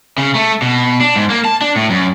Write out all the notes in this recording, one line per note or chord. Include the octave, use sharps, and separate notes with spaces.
C#3
A3
B2
D4
G#2
A#3
A5
D4
A2
F#2